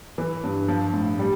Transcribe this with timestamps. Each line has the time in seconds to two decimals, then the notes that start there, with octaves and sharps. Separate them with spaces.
0.18 E3
0.44 G2
0.68 F3
0.93 A2
1.19 G3